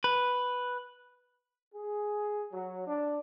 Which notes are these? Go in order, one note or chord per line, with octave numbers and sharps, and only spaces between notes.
B4
G#4
F#3
D4